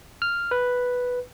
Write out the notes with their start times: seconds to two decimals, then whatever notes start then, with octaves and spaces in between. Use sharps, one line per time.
0.22 F6
0.51 B4